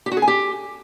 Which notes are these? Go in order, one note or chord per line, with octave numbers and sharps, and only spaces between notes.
G4
F#4
G#4
G#5
G4